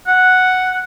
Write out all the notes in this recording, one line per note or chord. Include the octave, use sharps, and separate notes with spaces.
F#5